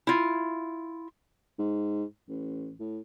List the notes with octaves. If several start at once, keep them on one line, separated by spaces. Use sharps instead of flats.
E4 F4
G#2
A1
A2